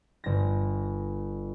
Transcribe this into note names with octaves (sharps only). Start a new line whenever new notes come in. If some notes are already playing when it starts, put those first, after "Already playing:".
G1 A#6